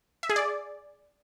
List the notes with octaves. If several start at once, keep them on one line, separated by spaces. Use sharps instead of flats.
E5
G#4
D5